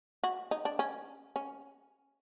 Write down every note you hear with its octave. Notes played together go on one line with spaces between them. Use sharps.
F#4
D#4
D4
C#4
C#4